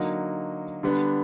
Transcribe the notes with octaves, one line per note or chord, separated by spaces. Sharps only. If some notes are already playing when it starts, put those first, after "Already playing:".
Already playing: D3 F#3 A#3 D#4 F#4
D3 G3 B3 D4